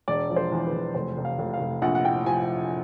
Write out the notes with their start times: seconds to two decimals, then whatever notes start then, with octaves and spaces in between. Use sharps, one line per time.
0.08 E1 D5
0.30 F3
0.36 C5
0.52 E2
0.66 B4
0.73 E2
0.95 F1 C5
1.17 F1
1.25 F5
1.38 F1
1.54 F5
1.61 F1
1.82 A#1 F#5
1.95 F#5
2.04 A2 G5
2.26 F3 G#5